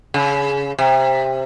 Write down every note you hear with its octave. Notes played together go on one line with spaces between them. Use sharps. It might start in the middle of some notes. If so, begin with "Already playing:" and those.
C#3
C3